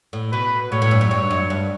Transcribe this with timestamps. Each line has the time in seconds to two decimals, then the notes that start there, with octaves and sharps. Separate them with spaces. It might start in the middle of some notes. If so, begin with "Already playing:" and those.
0.13 A2
0.33 B2 B4
0.72 A2 C#5
0.82 A2
0.91 G2
1.01 F#2
1.11 G2 C#5
1.31 F#2
1.50 G2